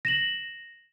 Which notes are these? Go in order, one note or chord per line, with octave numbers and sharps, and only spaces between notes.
A#6 E7 F#7